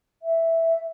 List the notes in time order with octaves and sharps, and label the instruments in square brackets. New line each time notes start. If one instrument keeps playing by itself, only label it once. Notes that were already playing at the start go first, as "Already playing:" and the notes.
[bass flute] E5